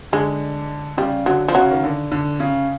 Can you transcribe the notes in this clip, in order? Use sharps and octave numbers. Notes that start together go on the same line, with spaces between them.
D3 G#3
C#3 G3
D3 F#3
F3
C#3 F#3
D#3
D3
D3
C#3